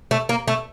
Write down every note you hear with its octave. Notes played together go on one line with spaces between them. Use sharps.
A3
A#3
A3